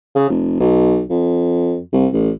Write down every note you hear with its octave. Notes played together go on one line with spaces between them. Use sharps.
C#3
F1
B1
F2
C2
A1